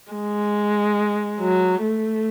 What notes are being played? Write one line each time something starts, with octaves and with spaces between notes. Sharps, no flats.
G#3
F#3
A3